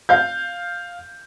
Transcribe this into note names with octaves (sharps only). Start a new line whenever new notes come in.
F5 G6